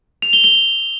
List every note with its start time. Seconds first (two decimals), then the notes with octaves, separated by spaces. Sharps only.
0.22 F7
0.33 G7
0.44 G7